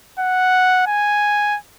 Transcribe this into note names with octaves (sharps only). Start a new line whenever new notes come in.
F#5
G#5